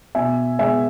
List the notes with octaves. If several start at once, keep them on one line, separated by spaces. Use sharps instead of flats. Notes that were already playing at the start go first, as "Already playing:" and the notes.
B2 E5 G#5
G#3 B3 E5 G#5